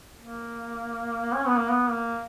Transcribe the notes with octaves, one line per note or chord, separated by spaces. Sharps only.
A#3
C#4
B3
A#3
B3
A#3